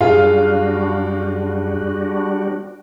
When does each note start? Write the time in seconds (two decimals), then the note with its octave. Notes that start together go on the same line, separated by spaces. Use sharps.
0.01 F#2 G3 D4 F4 F#4 G#4 F5